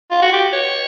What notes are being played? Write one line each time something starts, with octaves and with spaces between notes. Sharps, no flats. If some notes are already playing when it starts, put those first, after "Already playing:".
F4
F#4
G4
C#5